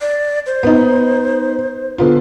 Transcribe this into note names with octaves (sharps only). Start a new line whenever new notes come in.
D5
C5
B3 D#4
D3 B3 F4